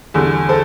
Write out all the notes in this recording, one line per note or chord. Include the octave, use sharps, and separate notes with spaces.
E2 D3 G3
A4 C5